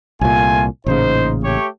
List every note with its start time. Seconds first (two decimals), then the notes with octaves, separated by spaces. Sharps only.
0.21 C2 A#2 A3 F4 G#5
0.86 A1 A#2 C#3 D#4 C5
1.44 A3 G4 C#5